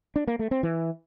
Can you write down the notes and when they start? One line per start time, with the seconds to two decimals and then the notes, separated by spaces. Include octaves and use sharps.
0.16 D4
0.27 A#3
0.39 A3
0.51 C4
0.63 E3